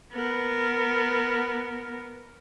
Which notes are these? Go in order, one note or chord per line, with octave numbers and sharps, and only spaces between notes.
B3 A#4